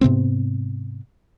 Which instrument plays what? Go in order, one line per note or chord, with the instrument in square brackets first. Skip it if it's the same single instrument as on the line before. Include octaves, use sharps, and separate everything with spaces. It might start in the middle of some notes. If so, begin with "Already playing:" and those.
[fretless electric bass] G#2 C3 B3 C4